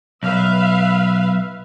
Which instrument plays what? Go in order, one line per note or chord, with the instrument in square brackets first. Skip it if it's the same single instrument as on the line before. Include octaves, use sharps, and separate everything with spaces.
[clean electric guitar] B1 [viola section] B4 E5 F5